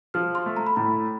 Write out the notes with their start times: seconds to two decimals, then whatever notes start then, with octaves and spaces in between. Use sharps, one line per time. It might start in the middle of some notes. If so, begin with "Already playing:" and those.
0.14 F3 F6
0.35 C6
0.46 A3
0.56 A#5
0.66 B5
0.76 A2 A#5